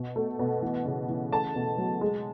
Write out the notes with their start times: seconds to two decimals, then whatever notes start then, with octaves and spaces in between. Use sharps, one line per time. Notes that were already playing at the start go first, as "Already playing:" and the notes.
Already playing: B2
0.16 A3
0.39 B2
0.62 E3
0.85 C#3
1.09 E3
1.31 A3 A5
1.55 B2
1.78 F#3
2.01 G#3